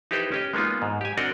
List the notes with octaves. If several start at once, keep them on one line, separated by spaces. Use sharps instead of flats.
D#4 E4 G4 A4 B4 C5
C#4 G4 D#5
G#3 A#3 B3 D#4 F4
G#2
G4 G#5
C4 D4 F#4 A#4 D#5 F#5